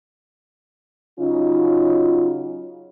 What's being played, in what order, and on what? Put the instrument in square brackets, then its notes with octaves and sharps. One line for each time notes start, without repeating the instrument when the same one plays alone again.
[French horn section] C#3 F#3 C#4 D#4 F4